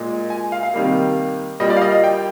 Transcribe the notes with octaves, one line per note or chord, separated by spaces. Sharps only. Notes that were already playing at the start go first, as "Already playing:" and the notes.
Already playing: A#2 G#3
G#5
F5
F5
C3 D#3 G3 A#3
A#2 G3 A#3 D#5
D5
F5
D#5
D#5
G5